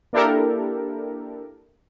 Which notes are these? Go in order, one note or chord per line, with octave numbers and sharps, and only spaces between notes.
A#3 D4 E4 G4 A4 A#4